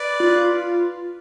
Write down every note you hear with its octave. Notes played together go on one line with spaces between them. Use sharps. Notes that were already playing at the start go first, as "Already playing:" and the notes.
Already playing: B4 D5
F4